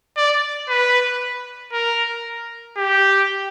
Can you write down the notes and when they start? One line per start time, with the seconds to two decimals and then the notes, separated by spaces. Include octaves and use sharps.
0.17 D5
0.69 B4
1.73 A#4
2.77 G4